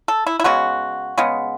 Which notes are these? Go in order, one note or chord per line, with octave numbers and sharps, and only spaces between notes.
A4
E4
E4
C#3 G#3 B3 F#4
C#3 G#3 B3